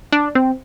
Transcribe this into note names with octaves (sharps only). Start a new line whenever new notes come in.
D4
C4